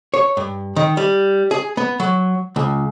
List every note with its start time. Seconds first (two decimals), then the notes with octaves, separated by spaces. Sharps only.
0.14 C#5
0.37 G2
0.76 D#3
0.97 G3
1.51 G#4
1.77 B3
2.00 F#3
2.56 C#2